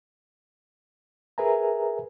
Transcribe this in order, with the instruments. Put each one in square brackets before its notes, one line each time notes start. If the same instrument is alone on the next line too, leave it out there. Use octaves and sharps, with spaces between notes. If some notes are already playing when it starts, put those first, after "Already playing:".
[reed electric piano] G#4 A#4 B4 E5 G#5 A#5